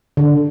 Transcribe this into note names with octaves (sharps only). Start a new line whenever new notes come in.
D3